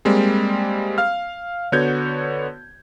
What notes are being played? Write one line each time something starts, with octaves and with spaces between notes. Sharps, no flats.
G3 G#3 A#3 C4
F5 F6
D3 B3 F#4 C#5 G6 G#6